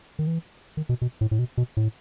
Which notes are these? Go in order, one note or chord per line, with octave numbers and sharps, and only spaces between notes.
D#3
E3
D#3
B2
B2
A2
A2
B2
B2
A2